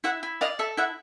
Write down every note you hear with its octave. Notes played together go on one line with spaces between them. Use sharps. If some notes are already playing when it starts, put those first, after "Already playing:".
E4 E5 F#5
E4
D5 D#5 F5
A4 E5
E4 E5 F#5